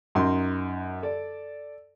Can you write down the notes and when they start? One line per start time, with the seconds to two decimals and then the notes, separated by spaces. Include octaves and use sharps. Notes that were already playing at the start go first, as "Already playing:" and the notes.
0.15 F#2 D#4 C6
1.03 A4 D5